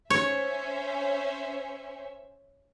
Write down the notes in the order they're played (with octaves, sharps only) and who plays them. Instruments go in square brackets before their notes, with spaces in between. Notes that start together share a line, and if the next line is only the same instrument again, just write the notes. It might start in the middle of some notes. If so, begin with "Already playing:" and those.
[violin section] C#4 C5 E5 [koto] C#5